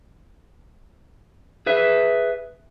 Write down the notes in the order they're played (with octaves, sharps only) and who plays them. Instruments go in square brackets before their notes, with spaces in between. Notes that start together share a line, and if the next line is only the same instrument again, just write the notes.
[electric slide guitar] G#4 B4 E5